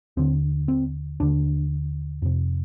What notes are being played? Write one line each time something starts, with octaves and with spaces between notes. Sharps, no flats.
D#2 D3 C4
C4
D#2 D3 D4
F2 C3